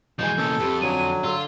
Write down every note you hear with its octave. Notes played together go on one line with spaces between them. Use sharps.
B2 E3 F3 G#3 G#5 G6
A#2 C#3 A4
F2 G4 B4
D3 F#3 C#4 D#7
D3 F4 A4 E6